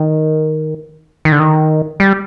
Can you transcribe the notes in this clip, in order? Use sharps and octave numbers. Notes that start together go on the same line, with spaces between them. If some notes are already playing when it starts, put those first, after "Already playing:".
Already playing: D#3
D#3
D3
D#3
G3